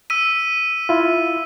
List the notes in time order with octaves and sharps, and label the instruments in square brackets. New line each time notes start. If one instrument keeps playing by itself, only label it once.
[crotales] E6 B6 D#7
[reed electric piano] E4 F4